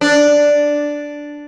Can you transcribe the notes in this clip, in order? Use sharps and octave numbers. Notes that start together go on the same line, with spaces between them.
D4